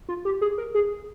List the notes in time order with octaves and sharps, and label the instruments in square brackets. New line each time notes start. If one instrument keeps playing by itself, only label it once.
[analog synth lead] F4
G4
G#4
A#4
G#4